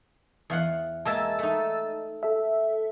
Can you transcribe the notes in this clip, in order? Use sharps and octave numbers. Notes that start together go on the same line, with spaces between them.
E2 F5 F#5
G#3 A#3 E5 A5 E6 A6
A3 D#4
A4 E5